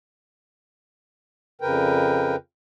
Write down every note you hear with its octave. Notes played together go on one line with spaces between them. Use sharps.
F2 C#3 A#4 B4 G5